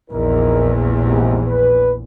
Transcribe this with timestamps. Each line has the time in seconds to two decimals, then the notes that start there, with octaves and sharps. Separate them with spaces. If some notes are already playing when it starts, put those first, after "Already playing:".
0.11 A#1 E2 D#4 E4 A#4
1.03 D#2 G#2 C3
1.47 B4